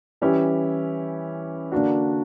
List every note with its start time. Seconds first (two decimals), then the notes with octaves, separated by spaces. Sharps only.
0.22 E3 G3 C#4 E4 G4
1.72 D3 A#3 D4 F#4